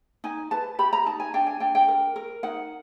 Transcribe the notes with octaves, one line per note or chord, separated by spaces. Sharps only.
D#4 G#5
B4 A5
G4 B5
A#5
D#4 A5
G#5
D4 G5
G#5
D4 G5
G5
A#4
A#4
D#4 F#5